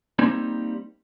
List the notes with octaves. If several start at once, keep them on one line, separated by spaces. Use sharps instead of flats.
G3 A#3 C4 D#4